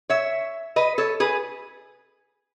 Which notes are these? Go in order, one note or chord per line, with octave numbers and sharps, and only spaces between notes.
C#5 E5
B4 D#5
A4 C#5
G#4 B4